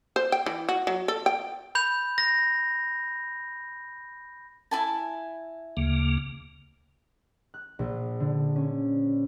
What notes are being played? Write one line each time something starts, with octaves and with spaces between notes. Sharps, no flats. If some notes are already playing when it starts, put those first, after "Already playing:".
C5
G5
E3
F#4
F#3
A4
G5
B5 G6 F7
A#6
E4 G#5 A5
D2 C#3 A#3
F#6
A#1
D3
C#4